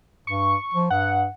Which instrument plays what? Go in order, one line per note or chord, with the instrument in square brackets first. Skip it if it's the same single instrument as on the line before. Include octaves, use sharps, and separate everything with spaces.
[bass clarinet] G2 [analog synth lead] C#6
[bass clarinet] F3
[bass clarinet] G2 [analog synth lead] F#5